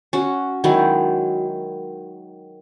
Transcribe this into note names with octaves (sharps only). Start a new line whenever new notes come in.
C#4 F#4
D#3 F#3 G#3 E4